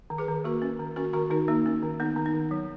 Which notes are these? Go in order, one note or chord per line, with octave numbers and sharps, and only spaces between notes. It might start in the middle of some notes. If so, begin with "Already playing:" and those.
D#3
G#4 B4
D#3
A#3 F#4 A#4
C#4
D#3
C#4 F#4 A#4
D#3 F#4 A#4
D#3 D#4 F#4
A#3 D#4
C#4
D#3
B3 D#4
D#3
D#4
D#3
F#3